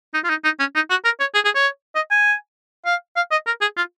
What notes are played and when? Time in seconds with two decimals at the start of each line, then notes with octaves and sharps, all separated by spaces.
0.14 D#4
0.24 F4
0.29 D#4
0.44 D#4
0.60 C#4
0.75 D#4
0.90 F#4
1.05 A#4
1.20 C#5
1.35 G#4
1.45 G#4
1.55 C#5
1.96 D#5
2.11 G#5
2.86 F5
3.16 F5
3.31 D#5
3.47 A#4
3.61 G#4
3.77 F4